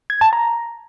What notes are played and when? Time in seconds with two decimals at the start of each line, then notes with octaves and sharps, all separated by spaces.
0.10 G#6
0.21 A5
0.33 A#5